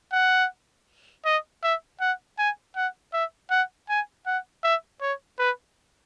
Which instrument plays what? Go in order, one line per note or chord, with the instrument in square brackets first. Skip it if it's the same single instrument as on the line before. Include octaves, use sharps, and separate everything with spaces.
[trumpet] F#5
D#5
E5
F#5
G#5
F#5
E5
F#5
G#5
F#5
E5
C#5
B4